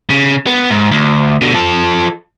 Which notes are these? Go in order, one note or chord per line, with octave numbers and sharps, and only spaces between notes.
C#3
B3
G#2
D2
B2 D3
F3 A4